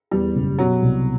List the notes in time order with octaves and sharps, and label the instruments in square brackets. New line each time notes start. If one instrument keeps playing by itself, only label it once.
[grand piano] E2 [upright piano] G3
[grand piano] F#1
[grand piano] B2 [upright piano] F#3
[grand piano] C2